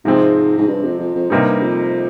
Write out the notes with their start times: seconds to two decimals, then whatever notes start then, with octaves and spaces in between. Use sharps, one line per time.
0.04 G#2 C3 F3 G#3 C4
0.58 G#2
0.68 G2
0.83 F2
0.99 F2
1.15 F2
1.30 G2 C3 G3 A#3 D#4
1.62 F2